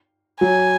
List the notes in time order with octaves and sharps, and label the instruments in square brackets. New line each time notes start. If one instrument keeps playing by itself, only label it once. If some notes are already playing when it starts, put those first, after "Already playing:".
[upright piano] F#3 [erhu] G#5